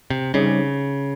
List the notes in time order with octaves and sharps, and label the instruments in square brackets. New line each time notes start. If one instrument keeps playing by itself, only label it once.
[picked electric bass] C3
[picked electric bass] C#3 [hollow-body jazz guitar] G3 C4 D#4 G#4 C#5